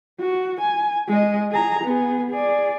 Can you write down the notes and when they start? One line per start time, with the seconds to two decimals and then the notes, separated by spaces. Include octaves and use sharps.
0.20 F#4
0.61 G#5
1.09 G#3 D#5
1.52 G#4 A#5
1.84 B3 G#4
2.31 G#4 D5